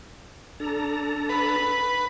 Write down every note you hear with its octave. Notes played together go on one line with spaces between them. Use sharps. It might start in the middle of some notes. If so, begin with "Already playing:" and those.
D4 A4 A#5
B4